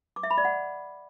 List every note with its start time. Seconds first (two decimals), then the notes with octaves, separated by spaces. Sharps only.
0.16 D6
0.23 E5
0.31 B5
0.38 D5
0.45 F#5